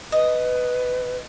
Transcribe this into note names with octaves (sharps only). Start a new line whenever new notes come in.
B4 D#5